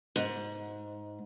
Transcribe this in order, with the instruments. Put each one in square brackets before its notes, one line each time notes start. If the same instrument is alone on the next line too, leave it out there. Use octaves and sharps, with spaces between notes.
[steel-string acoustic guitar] G#2